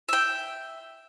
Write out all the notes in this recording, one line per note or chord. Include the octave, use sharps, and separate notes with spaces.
E5 G5